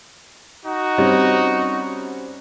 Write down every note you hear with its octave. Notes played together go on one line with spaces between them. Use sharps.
D#4 F#4
G3 C4 C#4